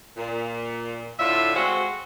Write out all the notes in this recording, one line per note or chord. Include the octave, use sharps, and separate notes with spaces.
A#2
A2 D3 F4 E5
G#3 C4 F#4